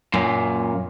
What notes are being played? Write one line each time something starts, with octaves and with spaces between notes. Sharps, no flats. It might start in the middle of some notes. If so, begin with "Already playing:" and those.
F#2 A#2